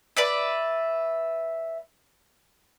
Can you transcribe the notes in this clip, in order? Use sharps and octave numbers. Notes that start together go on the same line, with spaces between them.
B4 D5 E5